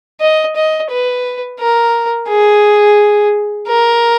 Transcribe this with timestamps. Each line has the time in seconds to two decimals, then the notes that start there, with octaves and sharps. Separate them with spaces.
0.21 D#5
0.56 D#5
0.91 B4
1.60 A#4
2.29 G#4
3.68 A#4